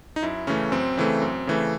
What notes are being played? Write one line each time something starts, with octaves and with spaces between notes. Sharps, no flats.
D#4
F#2 E4
C#3 E3 A3 C#4
F#2 C4
C#3 E3 A3
F#2
C#3 E3 A3